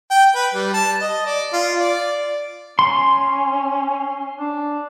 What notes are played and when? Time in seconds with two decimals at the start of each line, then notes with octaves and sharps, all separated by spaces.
0.11 G5
0.35 B4
0.54 G3
0.74 A5
1.01 D#5
1.26 D5
1.53 F4
1.80 D5
2.79 C#4 C6
4.38 D4